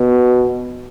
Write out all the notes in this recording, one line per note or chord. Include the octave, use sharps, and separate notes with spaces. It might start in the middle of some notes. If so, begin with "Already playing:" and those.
Already playing: B2